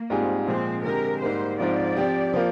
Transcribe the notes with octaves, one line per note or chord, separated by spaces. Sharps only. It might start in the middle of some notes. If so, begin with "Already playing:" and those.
Already playing: A#3
G#2 G3 C4 F4 G#4
A#2 F3 G#3 C4
D3 G#3 C4 G4 A#4
G#2 G3 A#3 C5
G#2 F3 C4 F4 D5
F3 C4 G4
F3 A#3 F4